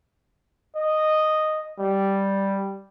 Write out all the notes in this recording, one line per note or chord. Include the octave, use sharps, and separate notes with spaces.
D#5
G3